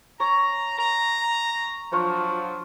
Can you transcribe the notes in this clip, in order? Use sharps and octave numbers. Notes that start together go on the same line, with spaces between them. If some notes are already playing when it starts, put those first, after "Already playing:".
C#5 A#5
A#5
F3 F#3 D4 F4 C#5